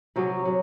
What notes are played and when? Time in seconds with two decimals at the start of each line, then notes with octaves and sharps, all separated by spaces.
0.16 C3 F#3 C#4 G#4
0.45 F#3